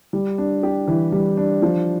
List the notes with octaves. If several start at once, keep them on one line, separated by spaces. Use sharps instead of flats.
G3
D4
G4
E3
G3
D4
F3